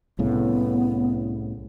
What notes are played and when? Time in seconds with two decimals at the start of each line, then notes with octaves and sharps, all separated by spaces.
0.19 C2 A2 C#3 B3